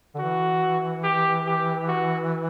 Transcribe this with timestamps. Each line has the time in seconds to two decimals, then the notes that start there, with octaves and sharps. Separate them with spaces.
0.15 D3
0.19 E3 F#4
1.04 G4
1.46 G4
1.88 F#4